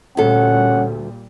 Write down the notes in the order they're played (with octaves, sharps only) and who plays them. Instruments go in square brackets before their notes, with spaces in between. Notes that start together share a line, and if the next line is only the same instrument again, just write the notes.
[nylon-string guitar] D2 A4 [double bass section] A#2 G3 [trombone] C#4 [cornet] F#5